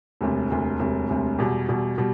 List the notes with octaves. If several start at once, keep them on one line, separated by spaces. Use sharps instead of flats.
E1 D2 C3
E1 D2 C3
E1 D2 C3
E1 D2 C3
E2 B2 G3
E2 B2 G3
B2 G3